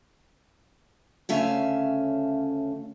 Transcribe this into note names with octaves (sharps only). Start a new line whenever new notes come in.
D2 C#3 A3 C#4 E5 F5